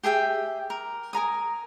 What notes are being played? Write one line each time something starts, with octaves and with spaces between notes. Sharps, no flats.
G4 G#4 E5 G5
A#4
A#4 G#5 A#5 D#6